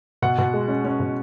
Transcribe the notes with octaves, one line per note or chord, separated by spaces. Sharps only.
B2 F#5
B2
G#3
C#4
C#4
B2